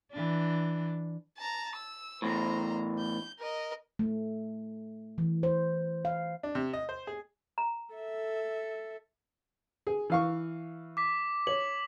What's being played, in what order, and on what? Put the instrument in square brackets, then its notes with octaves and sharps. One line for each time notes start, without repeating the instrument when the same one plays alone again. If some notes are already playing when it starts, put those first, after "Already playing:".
[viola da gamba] E3 D4
[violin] A5 A#5
E6
[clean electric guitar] E2 A2 [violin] C5 A#5
[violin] G6
A#4 D#5
[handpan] A3
E3
C5
F5
[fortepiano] D4
C3
D#5
C5
G#4
[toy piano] A#5
[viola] A4 [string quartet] E5
[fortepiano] G#4
E3 F5 C#6
[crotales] D6 B6
[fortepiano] C#5 [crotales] F#7